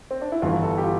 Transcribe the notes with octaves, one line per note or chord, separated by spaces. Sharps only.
C4
D4
E4
G1 G2 E3 F4
A4
G4
F4